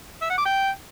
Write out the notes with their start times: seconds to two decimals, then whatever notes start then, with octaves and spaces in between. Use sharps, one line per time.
0.22 E5
0.30 F#5
0.38 D6
0.46 G5